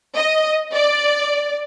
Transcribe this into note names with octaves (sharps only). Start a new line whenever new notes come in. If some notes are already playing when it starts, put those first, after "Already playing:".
D#5
D5